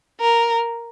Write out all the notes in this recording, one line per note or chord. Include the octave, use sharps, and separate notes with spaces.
A#4